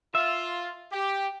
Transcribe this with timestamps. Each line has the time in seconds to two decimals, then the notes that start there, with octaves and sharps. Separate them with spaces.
0.15 F4 E5
0.92 G4